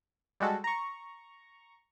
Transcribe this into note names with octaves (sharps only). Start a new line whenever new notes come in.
G3 G#3 F#4 A4
A#5 C#6